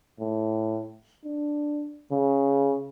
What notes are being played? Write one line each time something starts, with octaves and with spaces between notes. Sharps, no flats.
A2
D4
C#3